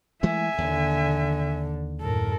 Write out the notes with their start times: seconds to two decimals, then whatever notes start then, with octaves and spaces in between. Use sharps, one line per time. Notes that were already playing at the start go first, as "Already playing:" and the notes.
0.23 E3 G#3 A3 E5 G#5
0.58 D#2 D3
2.01 F#2 A2 A4 A#4